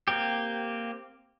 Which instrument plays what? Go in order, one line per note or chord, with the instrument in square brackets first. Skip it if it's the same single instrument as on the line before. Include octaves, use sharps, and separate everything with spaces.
[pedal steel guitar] A#3 C4 G4